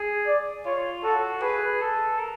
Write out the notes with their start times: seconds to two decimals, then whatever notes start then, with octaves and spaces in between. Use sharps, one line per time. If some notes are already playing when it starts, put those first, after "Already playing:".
Already playing: G#4
0.27 D5
0.66 F4 C#5
1.04 F#4 A4
1.42 G#4 B4
1.81 A4
2.19 A#4